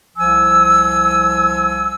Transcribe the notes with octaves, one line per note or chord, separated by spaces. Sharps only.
C2 F3 G#5 E6